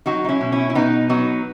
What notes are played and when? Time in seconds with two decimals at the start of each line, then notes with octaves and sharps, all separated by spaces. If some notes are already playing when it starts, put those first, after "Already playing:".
0.06 F#3 D#4 F#4
0.24 D#4
0.29 C#4 E4
0.41 B2
0.52 C#4 E4
0.70 E4
0.75 B2 B3 D#4
1.09 F#3 B3 D#4